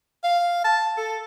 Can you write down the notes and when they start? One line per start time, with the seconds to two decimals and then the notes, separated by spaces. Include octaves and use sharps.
0.24 F5
0.64 A5
0.98 A4